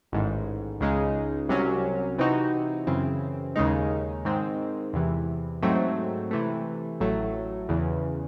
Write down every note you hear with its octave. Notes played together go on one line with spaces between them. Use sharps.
A1 G#2 D#3
C#2 C#3 G#3 D#4
C2 C3 F#3 C#4
C3 E3 C4 D#4 F#4
F#2 C#3 E3 C4
D#2 C#3 G#3 D#4
G#2 D#3 G#3 C4
E2 C3 E3
G#2 F#3 A3 C4
C3 E3 A3
A1 A2 F#3 A3
E2 C#3 E3